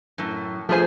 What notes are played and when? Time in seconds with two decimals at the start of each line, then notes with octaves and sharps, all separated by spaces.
0.18 F#2 A2
0.69 F3 A3 G#4 C5 G#5